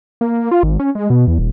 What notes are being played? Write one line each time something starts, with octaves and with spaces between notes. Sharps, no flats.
A#3
F4
G#1
C#4
G#3
B2
E2
D#1